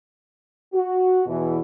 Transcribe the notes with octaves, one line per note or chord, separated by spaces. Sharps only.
F#4
E2 B2 E3